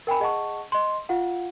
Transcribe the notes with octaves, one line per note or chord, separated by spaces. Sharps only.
A#4 G5 G#5 B5
G#4 D#5 F#5 A5 C#6
D#5 C6
F4 F5 F#5